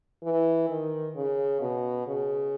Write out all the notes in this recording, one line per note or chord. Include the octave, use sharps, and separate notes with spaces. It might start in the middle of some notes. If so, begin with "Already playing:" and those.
E3
D#3
C#3
B2
C#3